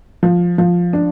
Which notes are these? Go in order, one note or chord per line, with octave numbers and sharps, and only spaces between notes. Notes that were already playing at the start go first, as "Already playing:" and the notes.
F3
F3
D4